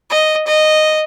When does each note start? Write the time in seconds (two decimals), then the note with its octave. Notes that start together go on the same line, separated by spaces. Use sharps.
0.10 D#5
0.47 D#5